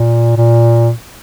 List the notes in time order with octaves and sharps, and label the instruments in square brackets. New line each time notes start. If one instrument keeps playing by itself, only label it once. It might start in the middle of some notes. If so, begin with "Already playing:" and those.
Already playing: [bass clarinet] A#2
A#2